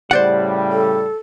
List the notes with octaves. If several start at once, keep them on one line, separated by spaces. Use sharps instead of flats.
A2 C#3 G3 C5 D5 F#5
A4